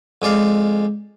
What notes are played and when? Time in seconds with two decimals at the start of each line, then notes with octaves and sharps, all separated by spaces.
0.22 F2 G#3 D5 F5